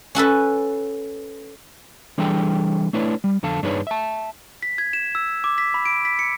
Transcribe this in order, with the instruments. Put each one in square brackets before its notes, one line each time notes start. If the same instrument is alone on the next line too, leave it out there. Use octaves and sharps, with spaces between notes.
[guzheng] C#4 F#4 A4 B4
[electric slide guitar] E3 G3 D4 G#4 A4 G5
A3 D4 E4 B4 C#5
G3
F2 D3 A4 F5 A5
G2 D4 D#4 G#4 B4 C#5
E5 A5
[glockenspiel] B6
G#6
E7
E6
D6
B6
B5
D7
B6
C#7